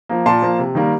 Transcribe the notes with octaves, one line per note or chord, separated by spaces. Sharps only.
F3 A#3
A#2 A5 C6
F3 A#3
C3
D#3 G3 A#3